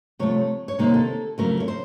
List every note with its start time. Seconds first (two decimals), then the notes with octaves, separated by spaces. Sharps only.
0.19 C3 F3 A3 C#5
0.68 C#5
0.79 C3 D#3 A#3 C5
0.94 A4
1.38 F2 C#3 F#3 A3 A#4
1.60 C#5
1.68 C5